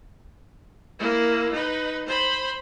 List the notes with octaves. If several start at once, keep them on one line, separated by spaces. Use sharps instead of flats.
A#3 E4
D#4 B4
C5 B5